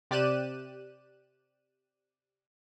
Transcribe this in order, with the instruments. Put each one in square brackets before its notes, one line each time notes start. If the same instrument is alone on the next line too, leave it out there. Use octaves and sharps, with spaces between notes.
[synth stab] C3 G4 D5 F#6 D#7 E7